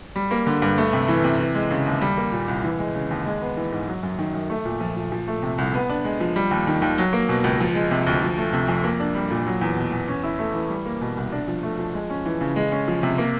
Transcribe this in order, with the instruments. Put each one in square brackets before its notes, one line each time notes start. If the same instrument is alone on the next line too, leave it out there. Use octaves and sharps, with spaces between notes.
[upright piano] G3
A#3
D3
G2
A3
C3
E3
C3
E3
G#3
C#3
D#2
G3
A#3
A#2
C2
E3
G#3
C#3
D#2
G#3
B3
E3
G#2
F#3
F#2
D#3
F#2
A3
A#2
F3
A#2
F3
A3
C3
C2
B3
D4
G#3
F3
G3
D#2
D#3
D#2
F#3
A#3
B2
C#2
F3
G#3
C3
D2
F3
A3
C3
F2
A#3
D4
G3
A#2
F#3
E2
B2
E2
C#4
E4
A3
E3
G3
A#3
B2
C2
D4
F3
A3
F3
G#3
C#4
E3
C#3
G#3
C#4
F3
C3
A#3